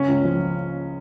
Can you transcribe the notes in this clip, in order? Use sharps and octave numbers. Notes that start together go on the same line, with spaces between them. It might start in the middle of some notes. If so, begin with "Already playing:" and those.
Already playing: C#3 C#4
C#2
F3